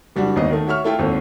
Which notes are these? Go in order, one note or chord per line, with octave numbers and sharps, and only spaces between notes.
F#1 G3 D4 F#4
G#1 D#2 B3 D#5
D#3 A3
F#4 C#5 E5 C#6 F6
A3 E4 F4 G5
G#1 D#2 C4 A4